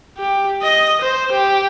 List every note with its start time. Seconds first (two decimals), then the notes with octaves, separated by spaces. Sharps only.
0.18 G4
0.62 D#5
1.01 C5
1.32 G4